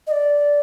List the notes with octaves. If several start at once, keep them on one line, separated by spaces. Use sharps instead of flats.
D#5
D5